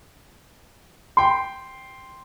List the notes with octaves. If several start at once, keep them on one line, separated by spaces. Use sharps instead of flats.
G5 C6